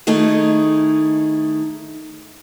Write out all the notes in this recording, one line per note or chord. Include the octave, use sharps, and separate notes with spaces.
D#3 A3 D#4 E4 G#4